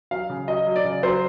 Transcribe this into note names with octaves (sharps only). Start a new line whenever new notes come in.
F#3 F5
C#3
F#3 D#5
F#3
D5
C#3
F#3 C5